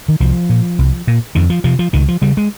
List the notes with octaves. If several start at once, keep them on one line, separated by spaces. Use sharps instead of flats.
D#3
C2 F3
A#2
C2
A#2
F2 D#3
F3
C3 F3
F3
C#2 D#3
F3
C#3 G3
G#3